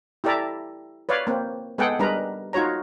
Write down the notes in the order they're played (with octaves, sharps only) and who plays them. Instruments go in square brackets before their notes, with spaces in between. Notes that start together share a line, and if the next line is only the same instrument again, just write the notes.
[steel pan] E4 G4 A4 D5 E5 A#5
B4 C#5 D5 F5
A#3 C4
G#3 B3 G#4 A4 F#5 G5
G3 G#3 D4 A#4 B4 A#5
D#4 F4 F#4 C#5 A#5